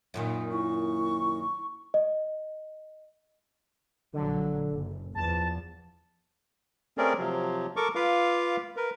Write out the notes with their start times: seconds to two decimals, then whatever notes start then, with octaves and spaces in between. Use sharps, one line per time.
0.14 F#2 A#2 D#3
0.52 E4 C#6
1.94 D#5
4.13 A#1 D3 F#3
4.70 F#1
5.15 E2 F3 A5
6.98 A3 C4 C#4 G#4 A#4 D5
7.19 C3 F3 F#3
7.76 A4 A#4 C#6 D6
7.95 F4 B4 F5 D6
8.77 A#4 B4